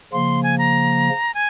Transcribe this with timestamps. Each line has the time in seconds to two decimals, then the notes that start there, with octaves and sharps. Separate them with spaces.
0.12 C#3 F3 A#3 C6
0.43 G#5
0.58 A#5
1.34 G#5